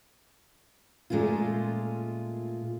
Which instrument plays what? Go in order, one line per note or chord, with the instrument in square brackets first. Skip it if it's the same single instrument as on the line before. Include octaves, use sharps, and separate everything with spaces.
[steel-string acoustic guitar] A#2 G#3 A3 C#4 F4